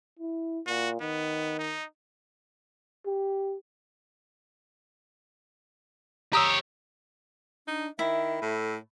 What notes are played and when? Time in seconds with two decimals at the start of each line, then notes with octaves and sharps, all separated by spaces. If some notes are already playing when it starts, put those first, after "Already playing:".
0.19 E4
0.67 A#2 F#4
1.01 D#3 B3
1.59 D#4
3.06 G4
6.33 G4 C#5 A#5 D#6 E6
7.67 D4 D#4
7.99 D#3 E4 E5
8.42 A2 A4